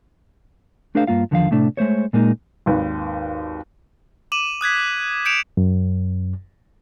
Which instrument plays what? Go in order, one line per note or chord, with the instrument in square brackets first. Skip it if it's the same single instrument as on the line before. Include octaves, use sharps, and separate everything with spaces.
[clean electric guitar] A3 D4 G#4 A#4 C5 F5
G2 A#3 F4 F5
E2 D3 D#3 F3 D#5 F5
A2 C3 A3 D4
G#3 A3 C5 C#5
A#2 G#3 A#3 D#4
[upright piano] G#1 D#2 B4
[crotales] D6 D#7 E7 F#7
D#6 F#6 G#6 B6
G6 C#7 D7 E7 F7
[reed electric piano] F#2